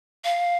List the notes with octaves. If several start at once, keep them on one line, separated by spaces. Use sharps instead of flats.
F5